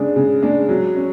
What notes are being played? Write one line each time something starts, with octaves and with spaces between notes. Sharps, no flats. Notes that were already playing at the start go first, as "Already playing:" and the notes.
Already playing: C#3 G#3 D4
C#3
G#3 D4
F#3
C#4